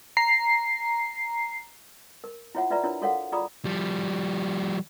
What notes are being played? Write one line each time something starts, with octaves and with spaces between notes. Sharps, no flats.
A#5 C7
A#4
E4 F4 C#5 E5 F#5
F4 B4 D5 E5 A#5
D4 E4 F4 A#4 C#5
F#4 A4 A#4 C#5 F5 F#5
F4 G#4 D5 A#5 B5 D#6
F3 G3